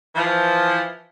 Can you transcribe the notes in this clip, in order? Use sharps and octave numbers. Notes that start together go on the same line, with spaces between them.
E3 F3